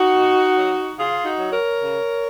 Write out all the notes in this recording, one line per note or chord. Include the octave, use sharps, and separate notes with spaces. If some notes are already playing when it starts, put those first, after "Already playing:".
Already playing: D#4 F#4
B2
F#3
C#3 F4 G#4
D#4 F#4
F#3
A#4 C#5
C#3